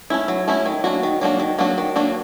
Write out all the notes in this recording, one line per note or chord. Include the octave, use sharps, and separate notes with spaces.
A3 C#4 E4
F#3
A3 C#4 E4
D#3
F#3 A#3 D4 F#4
D#3
F#3 A#3 D4 F#4
D#3
F#3 A#3 D4 F#4
D#3
F#3 A#3 D4 F#4